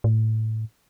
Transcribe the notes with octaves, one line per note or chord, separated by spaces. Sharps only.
A2